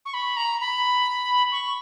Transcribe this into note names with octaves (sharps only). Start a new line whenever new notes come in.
C#6
B5
A#5
B5
C#6